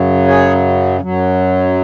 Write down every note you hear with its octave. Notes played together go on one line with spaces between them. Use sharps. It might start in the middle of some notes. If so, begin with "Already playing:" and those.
Already playing: F#2 C#3 F#3
G#4 C#5
F#2 F#3